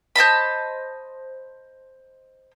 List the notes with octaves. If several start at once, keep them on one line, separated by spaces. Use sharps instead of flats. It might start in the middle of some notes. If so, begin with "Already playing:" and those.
C5 D#5 A5 B5